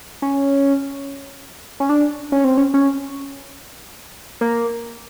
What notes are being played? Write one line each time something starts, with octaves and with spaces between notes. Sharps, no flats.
C#4
C#4
D4
C#4
C4
C#4
C#4
A#3